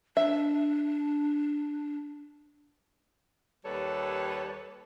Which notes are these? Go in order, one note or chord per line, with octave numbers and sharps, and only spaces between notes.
D4 E5
D#2 G3 A4 B4 C#5